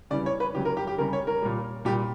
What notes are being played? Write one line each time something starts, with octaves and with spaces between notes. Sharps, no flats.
C#3 E3 G3 D5
C#5
B4
C#3 F#3 G4
A#4
G4
G4
C#3 G3 A#4
C#5
A#4
A#2 G3
A#2 G3 G4